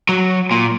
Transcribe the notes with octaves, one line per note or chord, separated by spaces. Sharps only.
F#3
A#2